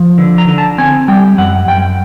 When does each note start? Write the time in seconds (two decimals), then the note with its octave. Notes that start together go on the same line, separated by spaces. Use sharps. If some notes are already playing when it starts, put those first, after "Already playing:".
Already playing: F3
0.18 D3
0.38 A#5
0.48 D3
0.58 A5
0.78 C4 G#5
1.08 G3 G5
1.38 F#2 F#5
1.68 F#2 G5